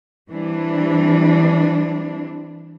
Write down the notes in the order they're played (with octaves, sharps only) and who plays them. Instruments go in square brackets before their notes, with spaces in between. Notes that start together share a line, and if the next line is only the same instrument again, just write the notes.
[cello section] E3 G3 C4 D4